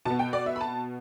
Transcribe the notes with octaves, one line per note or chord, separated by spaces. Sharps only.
B2 B3 A5
G5
D5
E5
B5
A5